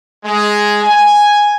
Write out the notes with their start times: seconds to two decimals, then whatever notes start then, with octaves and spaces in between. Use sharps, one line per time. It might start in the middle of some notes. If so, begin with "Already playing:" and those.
0.23 G#3
0.83 G#5